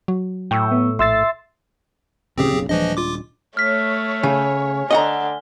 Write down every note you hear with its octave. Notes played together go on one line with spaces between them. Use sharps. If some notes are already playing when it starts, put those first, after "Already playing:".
F#3
A2 E4 G5 C#6 E6
B3
A#1 E5 C6 E6 A6 C7
D1 C#3 F3 C4 G4 G#4
F#1 B1 C#3
D#1 E3 F3 G#3 D4 D#5
F4 D6
A3 C#5 F6 B6
C#3 G#5
D3 D#5 F#5 A#5 G7